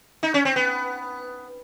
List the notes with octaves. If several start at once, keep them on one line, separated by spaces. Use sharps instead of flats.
D#4
C#4
C4
B3